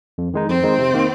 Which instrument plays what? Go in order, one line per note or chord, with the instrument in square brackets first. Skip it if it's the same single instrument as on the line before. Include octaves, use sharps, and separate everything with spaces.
[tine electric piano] F2
D#3 G#3 D#4
[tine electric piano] F2 [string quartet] C4
[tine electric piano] D#3 G#3 D#4
C3
D#3 A#3